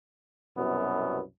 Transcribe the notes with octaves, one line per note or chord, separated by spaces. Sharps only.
C2 F#2 B2 B3